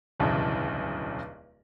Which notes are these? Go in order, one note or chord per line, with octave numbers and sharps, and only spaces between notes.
D1 B1 E2 G2 C#3